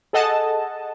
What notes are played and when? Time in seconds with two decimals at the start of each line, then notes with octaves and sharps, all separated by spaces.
0.13 G#4 A4 D#5 F#5 A5